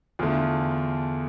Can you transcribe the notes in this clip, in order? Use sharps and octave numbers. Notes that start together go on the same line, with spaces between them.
E2 D3 A3 F4